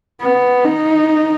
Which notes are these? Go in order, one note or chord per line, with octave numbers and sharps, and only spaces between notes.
B3
D#4